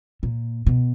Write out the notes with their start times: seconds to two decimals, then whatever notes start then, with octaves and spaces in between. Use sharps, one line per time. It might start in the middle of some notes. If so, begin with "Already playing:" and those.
0.23 A#2
0.66 B2